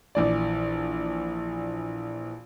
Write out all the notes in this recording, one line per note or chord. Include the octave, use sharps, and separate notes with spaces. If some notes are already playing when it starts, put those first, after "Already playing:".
A#1 E3 D5